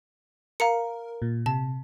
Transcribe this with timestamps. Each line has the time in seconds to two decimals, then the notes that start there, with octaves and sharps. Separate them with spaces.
0.60 A#4 F5 A#5 C#7
1.22 A#2
1.46 C3 A5